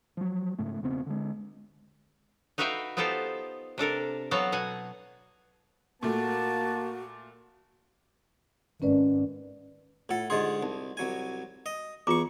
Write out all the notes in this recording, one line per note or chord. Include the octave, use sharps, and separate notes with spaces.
F3 F#3
G#2 C#3 A3
E1 C#3 B3 C4
D3 G#3
D#4 F#4 B4 E5 F5 G5
B3 D#4 F4 G4 A4 C5
C3 D4 A4 A#4
F#3 B3 F#4 A4 F5 F#5
B2 F#5 G#5
A#2 A3 A#3 F#4 A5
G#1 C#4 B4 D5
A2 F4 A4 F#5
G#2 D3 G4 G#4 D#5 C6
C2 D#4
C2 F#3 G#5
D#5
E2 F4 A#5 C#6 D6